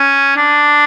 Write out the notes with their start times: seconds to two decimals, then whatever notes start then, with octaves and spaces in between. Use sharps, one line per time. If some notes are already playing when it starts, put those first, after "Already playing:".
Already playing: C#4
0.36 D4